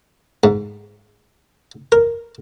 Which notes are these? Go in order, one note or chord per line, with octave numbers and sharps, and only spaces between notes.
G#2
A#4